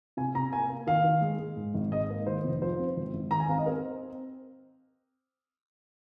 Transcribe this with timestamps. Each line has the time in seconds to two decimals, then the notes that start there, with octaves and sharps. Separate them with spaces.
0.17 C3 G#5
0.35 C3 A#5
0.52 A#3 G#5
0.69 A#3
0.87 D#3 F5
1.04 D#3
1.21 G#3
1.39 G#3
1.57 G#2
1.74 G#1
1.91 G#2 D#5
2.10 A#3
2.27 D#3 C5
2.44 F1
2.62 F3 C5
2.79 C4
2.97 G#1
3.13 G#1
3.31 D#3 A#5
3.40 G#5
3.49 C4 F5
3.58 D#5
3.66 C4 A#4